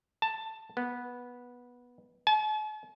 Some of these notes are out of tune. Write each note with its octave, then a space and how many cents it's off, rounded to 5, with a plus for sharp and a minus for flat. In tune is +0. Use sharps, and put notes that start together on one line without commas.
A5 +10
B3 -10
A5 -45